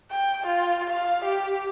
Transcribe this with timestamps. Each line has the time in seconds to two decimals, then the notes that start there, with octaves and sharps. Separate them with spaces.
0.10 G5
0.46 F4
0.90 F5
1.24 G4